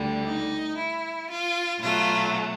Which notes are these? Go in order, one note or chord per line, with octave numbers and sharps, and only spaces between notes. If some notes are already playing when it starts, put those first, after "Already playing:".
Already playing: D2 D3 G3
D#4
E4
F4
B2 F#3 A3 F4